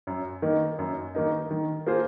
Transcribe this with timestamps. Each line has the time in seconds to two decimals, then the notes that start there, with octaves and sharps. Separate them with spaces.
0.07 F#2
0.42 D#3 A#3 D#4
0.79 F#2
1.15 D#3 A#3 D#4
1.51 D#3
1.87 A#3 F4 G#4 C5